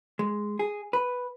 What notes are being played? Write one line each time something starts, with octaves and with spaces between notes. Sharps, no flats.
G#3
G#4
B4